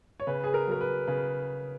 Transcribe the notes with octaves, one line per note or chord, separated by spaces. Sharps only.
C#5
C#3 B4
G#4
A#4
F#3 A#4
B4
C#3 B4